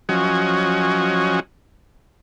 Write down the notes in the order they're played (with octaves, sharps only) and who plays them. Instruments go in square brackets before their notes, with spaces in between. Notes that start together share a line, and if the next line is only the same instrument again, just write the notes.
[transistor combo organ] F3 F#3 C#4 F#4 D#5 G#5